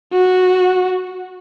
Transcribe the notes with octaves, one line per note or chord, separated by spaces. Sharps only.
F#4